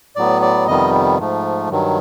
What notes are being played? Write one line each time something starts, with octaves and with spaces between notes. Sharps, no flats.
A2 F#3 B3 D5
D5
F2 C3 D#3 G3 B3 D#5
G#2 F3 A3
G2 D#3 F#3